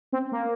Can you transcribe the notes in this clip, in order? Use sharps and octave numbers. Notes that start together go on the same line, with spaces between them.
C4
A#3